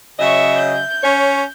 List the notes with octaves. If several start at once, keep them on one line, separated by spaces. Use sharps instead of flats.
C#3 F#3 D#5 E5 C#6
G6
C#4 C#5